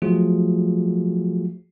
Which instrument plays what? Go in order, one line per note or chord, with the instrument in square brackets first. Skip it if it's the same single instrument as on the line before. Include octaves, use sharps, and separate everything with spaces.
[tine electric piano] F3 F#3 A3 F4 F#4 G#4